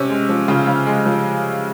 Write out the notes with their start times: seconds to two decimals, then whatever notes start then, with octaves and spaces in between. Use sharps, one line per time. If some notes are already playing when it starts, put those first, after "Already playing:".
Already playing: C3 C#4
0.09 G#3
0.29 F3
0.48 C#3 F4
0.67 C#3
0.87 G#3
1.06 F3